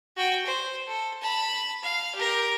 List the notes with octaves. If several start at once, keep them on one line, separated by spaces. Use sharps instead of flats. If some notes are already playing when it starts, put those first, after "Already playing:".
F#4 G5
C5
A4
A5 B5
F5
G4 A#4